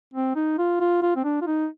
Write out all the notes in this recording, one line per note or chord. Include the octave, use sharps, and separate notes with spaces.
C4
D#4
F4
F4
F4
C4
D4
F4
D#4